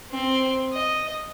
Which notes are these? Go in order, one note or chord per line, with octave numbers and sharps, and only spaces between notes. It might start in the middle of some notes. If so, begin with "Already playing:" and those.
C4
D#5